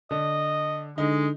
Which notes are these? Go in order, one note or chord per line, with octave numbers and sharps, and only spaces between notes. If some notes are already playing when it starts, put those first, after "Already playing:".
D3 D#5
D3 G#3 D#4